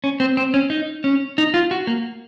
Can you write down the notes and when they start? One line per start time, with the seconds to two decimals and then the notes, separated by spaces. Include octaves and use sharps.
0.04 C#4
0.20 C4
0.37 C4
0.54 C#4
0.70 D#4
1.04 C#4
1.38 D#4
1.54 F4
1.71 F#4
1.87 A#3